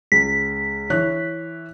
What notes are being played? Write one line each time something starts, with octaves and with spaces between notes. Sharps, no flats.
C#2 B6
E3 C#5 F#6